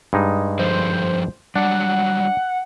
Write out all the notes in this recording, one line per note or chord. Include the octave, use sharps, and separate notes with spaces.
G2 G#3 D#4
F3 G#4 A4 C5
F#3 G3 D4 F#5